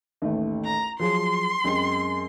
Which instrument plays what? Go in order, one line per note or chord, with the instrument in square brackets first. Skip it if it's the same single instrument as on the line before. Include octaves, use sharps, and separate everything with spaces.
[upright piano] A1 D#2 A3
[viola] A#5
[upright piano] F3 F#3 G#4 [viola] C6
[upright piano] F#2 G#3 C4